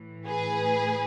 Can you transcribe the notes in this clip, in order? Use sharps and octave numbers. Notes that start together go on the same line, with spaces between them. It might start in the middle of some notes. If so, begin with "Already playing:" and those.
Already playing: A2 E3
G#4 B4